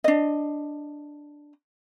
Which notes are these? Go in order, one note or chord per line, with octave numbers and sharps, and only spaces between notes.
D4 D#5